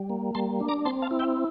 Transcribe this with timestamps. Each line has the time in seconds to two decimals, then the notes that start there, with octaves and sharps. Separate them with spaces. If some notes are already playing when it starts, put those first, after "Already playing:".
Already playing: G3
0.10 A#3
0.35 G3 A5 C6
0.60 D4
0.69 A#5 D6
0.85 C4 A5 C6
1.02 F5 A5
1.11 E4
1.19 E5 G5